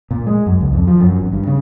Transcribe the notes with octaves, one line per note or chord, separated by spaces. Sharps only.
A#2
G#3
F#2
C#2
F2
F3
F#2
G#1
G2
C#3